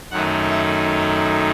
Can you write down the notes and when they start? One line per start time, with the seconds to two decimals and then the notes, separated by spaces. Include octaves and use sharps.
0.11 F#2 D#3 F#3 A3 D#4 F#5
0.49 E5